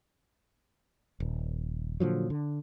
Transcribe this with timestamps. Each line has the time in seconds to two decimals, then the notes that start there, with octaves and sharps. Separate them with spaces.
1.20 D#1
2.00 A#2 D3 F3 F#3
2.30 D3